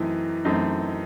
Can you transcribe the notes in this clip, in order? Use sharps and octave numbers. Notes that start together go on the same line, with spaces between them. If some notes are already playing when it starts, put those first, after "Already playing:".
Already playing: F#2 E3 A3 C4 D#4
F#2 E3 A3 C4 D#4